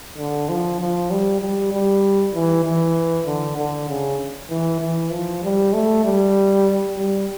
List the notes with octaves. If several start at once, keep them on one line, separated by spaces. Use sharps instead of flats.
D3
F3
F3
G3
G3
G3
E3
E3
D3
D3
C#3
E3
E3
F3
G3
A3
G3
G3